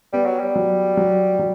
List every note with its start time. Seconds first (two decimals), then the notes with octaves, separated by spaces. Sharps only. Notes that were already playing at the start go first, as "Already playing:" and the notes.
0.13 G3 B3
0.26 F#3
0.39 G3
0.56 F#3
0.97 F#3
1.39 F#3